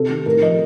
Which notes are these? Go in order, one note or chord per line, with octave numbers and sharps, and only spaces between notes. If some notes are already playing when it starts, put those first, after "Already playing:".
Already playing: C3 A4
D#3
A2 A#4
F3 D#5